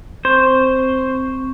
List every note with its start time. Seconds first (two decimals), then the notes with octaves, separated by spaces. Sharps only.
0.25 C4 C5 C#6